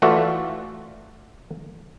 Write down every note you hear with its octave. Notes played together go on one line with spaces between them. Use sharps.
E3 A3 F4 F#4 D5 E5